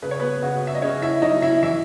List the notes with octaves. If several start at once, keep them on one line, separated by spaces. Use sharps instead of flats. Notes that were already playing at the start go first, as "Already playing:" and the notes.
C#3 B4
C#5
B3 B4
C#3 F#4
E5
D#5
C#3 C#4 C#5
E4 E5
F#3 D#4 D#5
E4 E5
E3 E4 E5